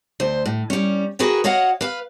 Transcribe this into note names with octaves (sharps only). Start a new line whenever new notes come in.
D2 C5
A2
G3 C#4
F#4 G#4 A#4 B4 G5
F#4 C#5 D#5 F5 F#5
B4 F5